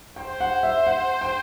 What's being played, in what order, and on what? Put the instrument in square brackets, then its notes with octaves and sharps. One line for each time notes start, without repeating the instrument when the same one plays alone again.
[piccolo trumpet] C5 [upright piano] G5
[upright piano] F#5
E5
F#5
G5